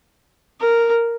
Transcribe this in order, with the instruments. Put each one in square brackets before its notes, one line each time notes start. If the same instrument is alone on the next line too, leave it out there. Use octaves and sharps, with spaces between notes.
[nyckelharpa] A#4